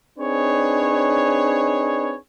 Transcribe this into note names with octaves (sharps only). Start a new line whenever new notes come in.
C4 D4 D#4 G#4 B4 C#5